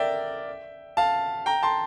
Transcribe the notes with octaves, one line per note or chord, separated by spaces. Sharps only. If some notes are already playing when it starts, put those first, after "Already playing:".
Already playing: A#4 D5 E5 G5
F5 A5
G5 A#5
A5 C6